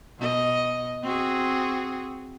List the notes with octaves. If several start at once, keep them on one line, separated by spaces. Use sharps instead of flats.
B2 D#5
C4 F#4 G#4